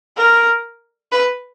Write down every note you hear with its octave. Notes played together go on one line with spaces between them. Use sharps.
A#4
B4